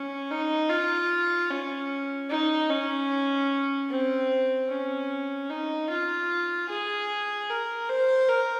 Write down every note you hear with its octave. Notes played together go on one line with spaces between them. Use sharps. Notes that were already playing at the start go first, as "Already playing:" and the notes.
Already playing: C#4
D#4
F4
C#4
D#4
C#4
C4
C#4
D#4
F4
G#4
A#4
C5
A#4